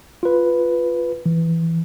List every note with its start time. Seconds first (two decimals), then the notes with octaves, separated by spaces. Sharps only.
0.23 F4 B4
1.26 E3